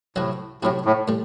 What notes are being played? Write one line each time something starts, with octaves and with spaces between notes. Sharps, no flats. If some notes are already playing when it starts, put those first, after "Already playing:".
A2 C3 F#3 C4 F#4
A2 C3 F#3 C4 F#4
A2
A2 G3